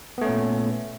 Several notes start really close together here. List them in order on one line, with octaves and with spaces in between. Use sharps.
B3 A3 C#4 A#2